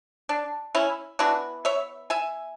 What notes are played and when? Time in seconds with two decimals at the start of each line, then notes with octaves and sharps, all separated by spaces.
0.29 D4
0.75 C#4 E4
1.19 E3 B3 D4 F#4
1.65 C#5 E5
2.10 E5 G#5